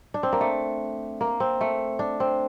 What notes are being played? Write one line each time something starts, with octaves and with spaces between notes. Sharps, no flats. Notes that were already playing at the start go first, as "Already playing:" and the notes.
D4
C4
A#3
A3
A#3
C4
A3
D4
C4